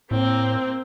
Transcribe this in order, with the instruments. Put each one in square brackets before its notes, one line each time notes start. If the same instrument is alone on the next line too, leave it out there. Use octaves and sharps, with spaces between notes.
[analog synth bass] A2 [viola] A#3 C4